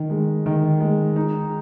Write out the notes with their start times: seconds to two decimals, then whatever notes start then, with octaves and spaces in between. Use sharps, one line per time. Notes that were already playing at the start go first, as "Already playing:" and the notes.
Already playing: D#3
0.10 G#3
0.46 D#3
0.81 G#3
1.16 D#4